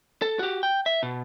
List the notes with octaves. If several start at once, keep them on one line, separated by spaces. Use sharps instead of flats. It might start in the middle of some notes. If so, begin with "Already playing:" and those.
A4
F#4 G4
G5
E5
B2